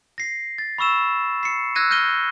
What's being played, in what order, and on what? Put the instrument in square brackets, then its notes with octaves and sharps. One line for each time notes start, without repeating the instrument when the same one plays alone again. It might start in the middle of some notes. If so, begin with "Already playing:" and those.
[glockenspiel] A#6 C7
A6
B5 C#6 E6 E7
C7 C#7
E6 F#6 G#6 A#6 D#7
F6 G6 A#6 D#7 G7